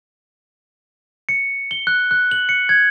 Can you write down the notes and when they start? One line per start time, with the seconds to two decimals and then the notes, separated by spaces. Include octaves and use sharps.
1.29 C#7
1.71 G7
1.87 F#6
2.11 F#6
2.31 F#7
2.49 C#7
2.69 G#6